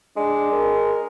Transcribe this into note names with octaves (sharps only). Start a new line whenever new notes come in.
G#3 D4
A#4